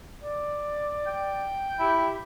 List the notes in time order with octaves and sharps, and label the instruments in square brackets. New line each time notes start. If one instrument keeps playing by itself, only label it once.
[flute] D5
[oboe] G5
[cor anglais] E4 [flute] G4